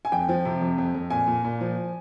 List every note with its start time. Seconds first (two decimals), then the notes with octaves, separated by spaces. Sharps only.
0.05 G#5
0.12 F2 G5
0.29 F3
0.45 C3
0.61 F2
0.78 F2
0.95 F2
1.10 A#2 G#5
1.27 A#2
1.45 A#2
1.61 F3